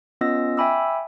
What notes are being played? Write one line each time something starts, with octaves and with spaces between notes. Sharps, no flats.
B3 C#4 F4 D#5 E6 A#6
E5 G5 G#5 B5 D6 E6